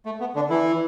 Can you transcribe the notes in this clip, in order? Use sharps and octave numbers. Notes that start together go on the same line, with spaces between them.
A3
B3
D3 D4
E3 E4